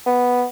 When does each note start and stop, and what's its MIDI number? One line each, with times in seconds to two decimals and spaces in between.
0.06 0.45 59